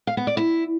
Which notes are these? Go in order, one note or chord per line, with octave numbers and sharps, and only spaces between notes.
F5
B3
D5
E4